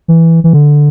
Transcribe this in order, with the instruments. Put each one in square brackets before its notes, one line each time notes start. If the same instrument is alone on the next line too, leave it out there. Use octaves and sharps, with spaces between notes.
[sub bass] E3
E3
D3